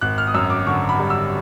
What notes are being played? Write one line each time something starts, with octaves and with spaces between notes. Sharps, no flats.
G#1 F#6
F6
D#6
F#2 E6
D6
D3 C#6
B5
G3
E6